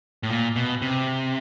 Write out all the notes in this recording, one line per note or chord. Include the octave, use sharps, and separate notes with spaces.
A2
A#2
B2
C3